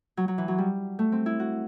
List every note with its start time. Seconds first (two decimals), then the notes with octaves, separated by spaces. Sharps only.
0.17 F#3
0.28 F#3
0.38 E3
0.48 F#3
0.58 G3
0.99 A3
1.12 C4
1.26 E4
1.40 F#4